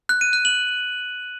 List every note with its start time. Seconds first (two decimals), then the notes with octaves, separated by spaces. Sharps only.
0.09 F#6
0.21 D#7
0.33 F#6
0.45 F#7